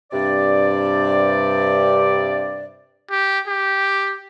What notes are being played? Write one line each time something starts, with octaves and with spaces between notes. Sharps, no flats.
G2 C3 D5
G4
G4